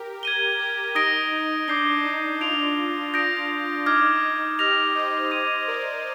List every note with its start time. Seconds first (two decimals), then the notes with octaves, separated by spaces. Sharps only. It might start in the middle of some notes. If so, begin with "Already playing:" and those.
Already playing: G4 A#4
0.23 G#6 D#7 G7
0.59 G4 A#4
0.95 D#4 D#6 A#6 D7 G7
1.31 D#4
1.68 D4 D6 G6 C7 G7
2.05 D#4
2.40 D4 F4 G6 D7 F7
3.13 D4 F4 D#6 G6 A#6 D7
3.50 D4
3.86 D#4 D6 F6 G#6
4.22 D#4
4.58 D#4 G4 F6 A#6 F7
4.95 C5 D#5
5.31 D6 G#6 D#7
5.67 A#4 D5